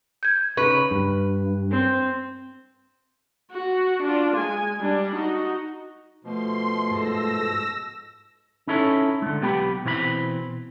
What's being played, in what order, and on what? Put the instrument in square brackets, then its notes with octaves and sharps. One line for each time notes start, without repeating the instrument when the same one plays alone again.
[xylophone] G6 G#6
[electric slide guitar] C#3 D#4 [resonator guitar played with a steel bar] B4 [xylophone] C#6
[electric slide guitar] G2
[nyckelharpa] C4
[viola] F#4
D4 F4
G#3 G#5
G3 D4
D#4 F#4
[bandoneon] B2 F3 [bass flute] A3 [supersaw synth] C6
[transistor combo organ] G#2 A4 [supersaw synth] E6 A#6
[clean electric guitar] C#4 D#4 E4 A4 C#5
D3 G#3
B1 B3 G4 G5 A#5 B5
B2 E3 C4 C5 B5